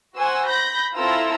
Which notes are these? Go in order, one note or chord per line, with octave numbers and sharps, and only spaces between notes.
F#4 C5 F#5 G#5 E6
B5 G6 A#6
C4 E4 F4 A4 A#5 E6